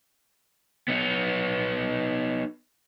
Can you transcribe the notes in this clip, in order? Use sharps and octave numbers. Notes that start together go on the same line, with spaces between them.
B3 D#4